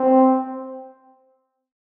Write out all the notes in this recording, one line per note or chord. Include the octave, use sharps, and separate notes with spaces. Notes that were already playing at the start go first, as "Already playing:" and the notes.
Already playing: C4